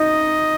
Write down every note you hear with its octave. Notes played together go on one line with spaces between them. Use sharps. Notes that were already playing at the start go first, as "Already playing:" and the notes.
Already playing: D#4 D#5